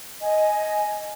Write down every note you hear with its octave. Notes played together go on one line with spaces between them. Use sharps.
D#5 G#5